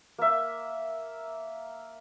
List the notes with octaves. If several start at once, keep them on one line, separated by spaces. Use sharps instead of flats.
A#3 E5